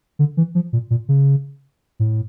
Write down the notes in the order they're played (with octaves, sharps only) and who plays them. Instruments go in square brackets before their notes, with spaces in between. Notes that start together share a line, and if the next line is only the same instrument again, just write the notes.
[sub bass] D3
E3
F3
A#2
A#2
C#3
A2